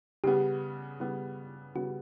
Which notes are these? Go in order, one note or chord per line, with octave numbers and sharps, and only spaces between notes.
C#3 G3 B3 G4
C#3 G3 B3
C#3 G3 B3 F#4